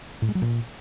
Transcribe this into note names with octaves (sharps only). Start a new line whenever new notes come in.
A2
G#3
F#3
A#2